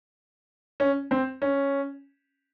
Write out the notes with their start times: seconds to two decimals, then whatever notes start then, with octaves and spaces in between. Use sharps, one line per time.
0.80 C#4
1.11 C4
1.42 C#4